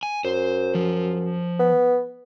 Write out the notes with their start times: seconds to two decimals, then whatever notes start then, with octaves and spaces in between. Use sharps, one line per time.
0.03 G#5
0.25 F#2 C5
0.75 F3
1.59 B3